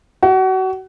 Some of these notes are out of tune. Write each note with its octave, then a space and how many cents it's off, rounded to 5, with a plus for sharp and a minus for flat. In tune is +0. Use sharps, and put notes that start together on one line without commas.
F#4 +30